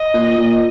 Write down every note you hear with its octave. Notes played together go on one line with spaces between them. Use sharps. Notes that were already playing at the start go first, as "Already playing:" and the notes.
Already playing: D#5
A#2
A#2